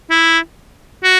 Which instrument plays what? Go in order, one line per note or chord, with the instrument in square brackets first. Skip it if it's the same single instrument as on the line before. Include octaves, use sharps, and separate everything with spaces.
[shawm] E4
F#4